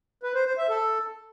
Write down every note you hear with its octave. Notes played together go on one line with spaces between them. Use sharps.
B4
C5
C5
E5
A4